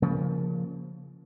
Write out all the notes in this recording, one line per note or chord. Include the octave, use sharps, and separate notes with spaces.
C#3 F3 A#3